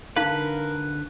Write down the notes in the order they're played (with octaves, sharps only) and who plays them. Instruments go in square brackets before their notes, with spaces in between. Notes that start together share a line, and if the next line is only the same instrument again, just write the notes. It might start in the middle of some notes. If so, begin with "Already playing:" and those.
[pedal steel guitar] D3 B4 [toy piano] D#4 F5 [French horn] A#4